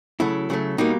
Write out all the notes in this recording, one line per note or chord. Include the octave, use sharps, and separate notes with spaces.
C#3 F#3 A3 E4
C#3 F#3 A3
B2 G3 A#3 D#4